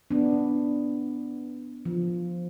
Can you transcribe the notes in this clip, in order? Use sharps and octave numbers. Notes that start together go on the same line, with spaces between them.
B3 D4
F3